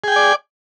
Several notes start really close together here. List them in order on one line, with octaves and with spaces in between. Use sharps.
G#4 G5 G#5 D5